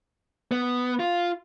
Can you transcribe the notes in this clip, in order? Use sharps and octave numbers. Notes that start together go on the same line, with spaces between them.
B3
F4